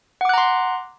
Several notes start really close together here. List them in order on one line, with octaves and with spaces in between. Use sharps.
F#5 D6 F#6 A#5 C6